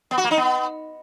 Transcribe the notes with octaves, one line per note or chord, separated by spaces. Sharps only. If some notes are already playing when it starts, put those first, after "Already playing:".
B3
F#4
A#3
D#4
B3